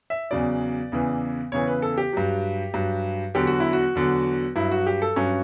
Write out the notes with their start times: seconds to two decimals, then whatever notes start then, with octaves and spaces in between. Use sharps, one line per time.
0.10 E5
0.31 E2 C#3 F#3 D5
0.92 E2 C#3 E3
1.52 E2 C#3 E3 C#5
1.67 B4
1.82 A4
1.98 G4
2.13 G2 F#3
2.74 G2 F#3
3.34 E2 D3 F#3 G4
3.47 F#4
3.60 E4
3.73 F#4
3.95 E2 D3 F#3
4.56 G2 F#3 E4
4.71 F#4
4.87 G4
5.02 A4
5.16 G2 F#3 C#4